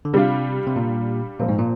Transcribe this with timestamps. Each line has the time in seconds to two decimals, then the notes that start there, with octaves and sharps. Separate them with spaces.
0.05 D3
0.13 C3 G3 D4 F4
0.67 C3
0.76 A#2
1.39 A#2 F3 C4 F4
1.48 G#2
1.59 A#2